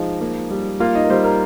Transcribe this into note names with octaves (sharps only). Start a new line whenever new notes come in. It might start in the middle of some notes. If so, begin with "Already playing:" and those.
Already playing: F3 G#3 D#4
A#3
G3
A#3 F4 F5
D#4 D#5
A#4
G3 C5
A#4